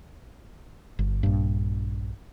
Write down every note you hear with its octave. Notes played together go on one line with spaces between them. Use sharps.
G1
A#1 G2